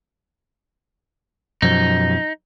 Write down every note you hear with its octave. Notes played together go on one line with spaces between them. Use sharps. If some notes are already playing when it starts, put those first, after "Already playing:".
F#2 B2 F3 D#4